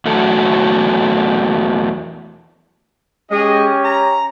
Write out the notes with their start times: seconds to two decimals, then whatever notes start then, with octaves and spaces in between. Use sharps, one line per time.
0.05 E2 F#3 A3 F#4 A4
3.31 G#3 C#4 G4 G#4 D#5
3.85 A#5